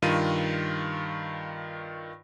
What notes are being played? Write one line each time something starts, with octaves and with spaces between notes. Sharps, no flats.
G2 D#3 F4 D#7